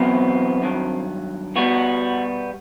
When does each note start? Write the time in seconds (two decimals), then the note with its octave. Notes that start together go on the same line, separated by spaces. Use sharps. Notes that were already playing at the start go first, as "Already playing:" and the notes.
Already playing: E2 B2 F#3 B3 C4
0.62 G2 D#3 F#3
1.56 B2 G3 B3 F#4